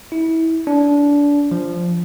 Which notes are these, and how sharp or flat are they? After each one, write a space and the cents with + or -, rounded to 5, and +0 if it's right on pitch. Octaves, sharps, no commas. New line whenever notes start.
E4 -25
D4 -25
F3 -5